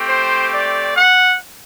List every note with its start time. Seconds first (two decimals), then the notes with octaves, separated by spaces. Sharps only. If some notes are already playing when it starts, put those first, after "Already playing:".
Already playing: A3 C4 G4
0.08 C5
0.52 D5
0.96 F#5